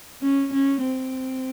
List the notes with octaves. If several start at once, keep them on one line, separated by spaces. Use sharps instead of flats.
C#4
C#4
C4